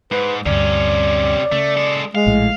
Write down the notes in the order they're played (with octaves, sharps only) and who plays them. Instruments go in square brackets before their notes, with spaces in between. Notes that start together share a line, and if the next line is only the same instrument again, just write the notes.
[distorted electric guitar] G#2 [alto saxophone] B4
[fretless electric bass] D2 G2 [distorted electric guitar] C3 C#4 [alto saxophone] D5
[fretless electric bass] C#3 [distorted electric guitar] A3
[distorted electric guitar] G#3 A4
[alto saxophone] G#3 [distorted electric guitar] F5
[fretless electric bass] A#1 A2